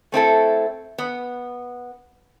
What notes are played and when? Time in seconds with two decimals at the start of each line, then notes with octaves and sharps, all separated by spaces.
0.12 A3 C4 E4 A4
0.98 B3